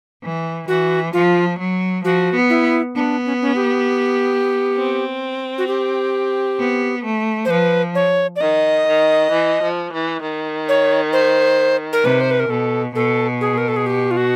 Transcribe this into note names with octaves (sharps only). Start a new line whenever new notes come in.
E3
E3 F#4
F3 F4
F#3
F3 F#4
B3
E4
B3 D4
C#4
C#4
G4
C4
F#4
G4
B3
A3
C5
F3 B4
C#5
D5
D#3 D#5
D#3
E3
F3
E3
D#3
C#5
C5
A#4
C3 B4
C5
B4
A#4
B2 A4
B2 A4
G#4
A#4
A4
G#4
G4
F4
F#4